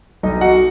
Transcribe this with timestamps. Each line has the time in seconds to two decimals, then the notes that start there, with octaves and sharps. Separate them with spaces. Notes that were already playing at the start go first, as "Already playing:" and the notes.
0.23 B1 D#4 D#5
0.41 F#4 F#5